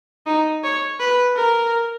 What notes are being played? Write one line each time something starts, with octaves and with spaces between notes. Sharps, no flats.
D#4
C#5
B4
A#4